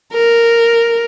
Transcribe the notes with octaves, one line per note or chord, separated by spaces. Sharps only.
A#4